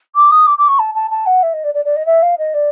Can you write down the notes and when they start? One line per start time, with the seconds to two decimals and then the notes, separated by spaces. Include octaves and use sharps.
0.15 D6
0.31 D#6
0.46 D6
0.58 D6
0.68 C#6
0.79 A5
0.94 A5
1.10 A5
1.26 F#5
1.43 E5
1.53 D#5
1.64 D5
1.74 D5
1.85 D5
1.96 D#5
2.06 E5
2.22 F5
2.38 D#5
2.54 D5